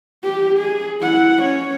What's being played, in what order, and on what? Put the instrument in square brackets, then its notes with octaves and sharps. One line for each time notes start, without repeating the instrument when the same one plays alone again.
[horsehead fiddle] G4
G#4
E4 F#5
C#4 C#5